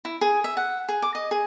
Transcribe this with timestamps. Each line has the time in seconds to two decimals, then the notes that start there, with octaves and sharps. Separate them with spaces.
0.05 E4
0.21 G#4
0.44 E5
0.57 F#5
0.89 G#4
1.02 D6
1.15 D#5
1.31 G#4